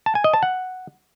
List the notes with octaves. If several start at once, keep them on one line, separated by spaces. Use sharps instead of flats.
A5
G#5
D#5
A5
F#5